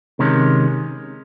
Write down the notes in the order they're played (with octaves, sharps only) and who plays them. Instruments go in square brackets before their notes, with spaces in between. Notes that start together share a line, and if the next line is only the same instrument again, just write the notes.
[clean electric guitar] C3 D#3 G#3 C#4